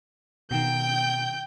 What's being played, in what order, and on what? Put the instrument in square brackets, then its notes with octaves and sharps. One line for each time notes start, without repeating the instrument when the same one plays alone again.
[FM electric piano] B2 D#3 [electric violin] G5 G6